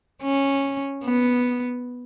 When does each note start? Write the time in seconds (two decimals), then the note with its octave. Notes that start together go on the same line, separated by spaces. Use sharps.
0.22 C#4
1.04 B3